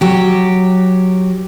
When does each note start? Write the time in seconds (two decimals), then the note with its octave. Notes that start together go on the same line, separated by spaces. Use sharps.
0.01 F#3 G4